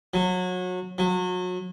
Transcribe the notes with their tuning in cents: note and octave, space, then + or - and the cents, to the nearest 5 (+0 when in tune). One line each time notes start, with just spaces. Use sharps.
F#3 -25
F#3 -30